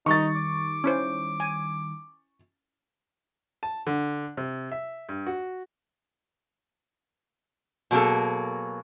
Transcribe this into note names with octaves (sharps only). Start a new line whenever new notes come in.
D#3 G3 D#4 C#6 A6
D6
C#4 E4 C5
G#5
A5
D3
C3
E5
G2
F#4
B2 F#3 A#3 G#4 A4